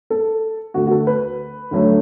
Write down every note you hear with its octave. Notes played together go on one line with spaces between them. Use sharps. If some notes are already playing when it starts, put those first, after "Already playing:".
A4
D2 D3 A3 F#4
F#4
A4
B4
D2 D3 F#3 A3